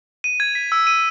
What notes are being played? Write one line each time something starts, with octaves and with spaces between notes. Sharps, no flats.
D#7
G#6
B6
E6
D#7